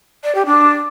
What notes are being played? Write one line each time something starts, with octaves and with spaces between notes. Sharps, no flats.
D5
G4
D4